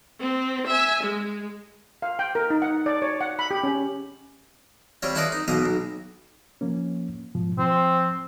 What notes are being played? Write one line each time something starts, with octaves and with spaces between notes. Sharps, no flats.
C4
E5 G#5
G#3
F5
G5
A#4
D#4
F#5
D5
C#5
F#5
B5
G4
C#4
G3 C4 F4 C#5
E4 F4 A4 B4 D5 D#5
D#4
B1 B2 A#3 D#5 A#5
B1
F3 A#3 C#4
G#2 B2 F3
F3 C4